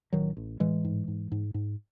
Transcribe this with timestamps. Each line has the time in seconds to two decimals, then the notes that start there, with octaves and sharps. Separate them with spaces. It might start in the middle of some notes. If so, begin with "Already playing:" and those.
0.13 A1 D#3 F#3
0.37 A1
0.60 A2 E3 G#3
0.85 G#2
1.08 G#2
1.32 G#2
1.54 G#2